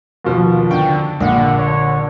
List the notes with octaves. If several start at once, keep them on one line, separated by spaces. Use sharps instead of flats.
D#2 B2 F3
D3 G5 A5 C#6
A#1 D3 F#5
C#5